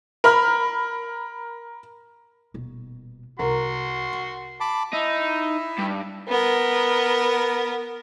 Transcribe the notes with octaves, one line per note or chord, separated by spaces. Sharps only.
A#4 B5 F6
D#1 B2
C2 F#4 A#4 C6
A5 B5 D6
D#4 E4 E5
G2
B3 A#4